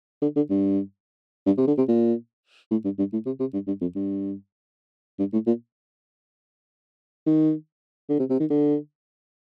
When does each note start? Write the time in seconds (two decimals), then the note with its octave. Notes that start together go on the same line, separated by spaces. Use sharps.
0.22 D3
0.36 D3
0.50 G2
1.46 G2
1.57 C3
1.67 D3
1.78 C3
1.88 A#2
2.71 A2
2.85 G2
2.98 G2
3.12 A2
3.26 C3
3.40 C3
3.53 G2
3.67 G2
3.81 F2
3.95 G2
5.19 G2
5.33 A2
5.47 A#2
7.26 D#3
8.09 D3
8.19 C3
8.30 C3
8.40 D#3
8.50 D3